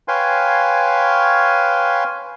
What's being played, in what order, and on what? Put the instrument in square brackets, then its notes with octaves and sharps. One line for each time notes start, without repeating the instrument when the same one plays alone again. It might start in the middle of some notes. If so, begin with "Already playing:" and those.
[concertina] B4 C#5 F5 G5 G#5 C6